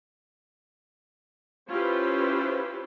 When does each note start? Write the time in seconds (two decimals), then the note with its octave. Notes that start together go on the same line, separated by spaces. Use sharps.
1.69 C#4 E4 F4 G4 B4 C5